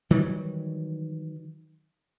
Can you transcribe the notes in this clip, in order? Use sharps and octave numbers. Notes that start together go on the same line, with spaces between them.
D#3 E3 F#3 G3